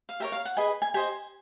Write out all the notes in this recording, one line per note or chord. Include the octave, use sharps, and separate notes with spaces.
F5
G4 A#4 C#5 E5
F5
F#5
G#4 B4 D#5 G#5
G#5
G4 C5 D#5 G#5